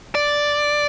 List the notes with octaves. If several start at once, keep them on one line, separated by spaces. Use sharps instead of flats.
D5